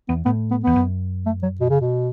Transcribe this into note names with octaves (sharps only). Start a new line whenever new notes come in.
E2 B3
A2 B3
B3
E2 B3
F#2
A3
F#3
B2
C#3
B2